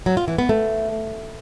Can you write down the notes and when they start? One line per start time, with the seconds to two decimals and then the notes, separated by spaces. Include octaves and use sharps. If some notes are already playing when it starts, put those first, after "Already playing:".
0.06 F#3
0.17 F4
0.28 E3
0.38 B3
0.49 A3